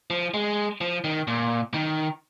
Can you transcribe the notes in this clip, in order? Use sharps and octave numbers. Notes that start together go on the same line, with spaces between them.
F3
G#3
F3
D#3
A#2
D#3